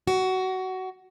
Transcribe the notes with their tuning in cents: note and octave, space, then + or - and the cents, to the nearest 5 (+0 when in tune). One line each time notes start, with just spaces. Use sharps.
F#4 +15